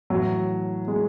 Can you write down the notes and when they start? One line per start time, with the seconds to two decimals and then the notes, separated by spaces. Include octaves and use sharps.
0.10 A2 E3 F#3
0.88 G#3